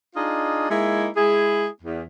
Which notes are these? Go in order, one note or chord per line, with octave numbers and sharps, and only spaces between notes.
D4 D#4 F4 G#4 D#5
G#3 A#3 D#4 E4
G#3 E4 G#4
E2